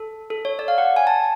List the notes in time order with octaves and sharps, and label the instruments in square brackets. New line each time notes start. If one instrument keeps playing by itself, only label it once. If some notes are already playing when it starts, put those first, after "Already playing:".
Already playing: [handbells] A4
A4
C#5
D5
F5
F#5
G#5
A5